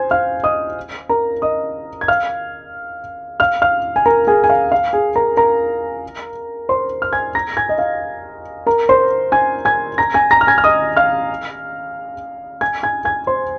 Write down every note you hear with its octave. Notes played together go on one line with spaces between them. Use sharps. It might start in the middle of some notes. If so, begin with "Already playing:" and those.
Already playing: C5 G#5 G#6
F5 F6
D#5 D#6
A#4 A#5
D#5 D#6
G#6
F5 F6
F5 F6
F5 F6
G#5
A#4 A#5
G#4 G#5
G#5
F5
F5
G#4 G#5
A#4 A#5
A#4 A#5
C5 C6
F6
G#5 G#6
A#5 A#6
G#5 G#6
D#5
F5
A#4 A#5
C5 C6
G#5 G#6
G#5 G#6
A#5 A#6
G#5 G#6
A#5 A#6
F6
G#5 G#6
F6
D#5 D#6
F5 F6
G#5 G#6
G#5 G#6
G#5 G#6
C5 C6